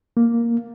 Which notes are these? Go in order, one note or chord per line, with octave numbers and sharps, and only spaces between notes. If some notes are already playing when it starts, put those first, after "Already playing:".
A#3